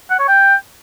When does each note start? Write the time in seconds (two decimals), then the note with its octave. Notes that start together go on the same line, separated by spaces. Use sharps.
0.10 F#5
0.19 C#5
0.28 G5